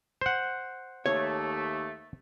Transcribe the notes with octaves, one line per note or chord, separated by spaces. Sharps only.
C5 F#5
D#2 A3 C#5